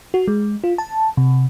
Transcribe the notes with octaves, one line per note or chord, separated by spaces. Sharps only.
F#4
G#3
F4
A5
C3